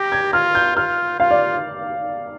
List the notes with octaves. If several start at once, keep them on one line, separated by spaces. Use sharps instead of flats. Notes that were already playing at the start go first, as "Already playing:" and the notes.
Already playing: G4 A#6
G#6
F4 F6
G6
F4 F6
F4 F5
D5